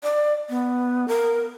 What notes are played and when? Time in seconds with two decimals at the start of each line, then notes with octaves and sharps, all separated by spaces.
0.03 D5
0.49 B3
1.08 A#4